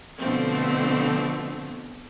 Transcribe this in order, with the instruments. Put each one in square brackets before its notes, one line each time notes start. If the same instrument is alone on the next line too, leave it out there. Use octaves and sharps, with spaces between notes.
[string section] B2 D3 F3 A3 C4